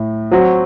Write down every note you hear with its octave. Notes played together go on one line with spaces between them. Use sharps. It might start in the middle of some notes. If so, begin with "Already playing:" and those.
Already playing: A2
F#3 C4 F#4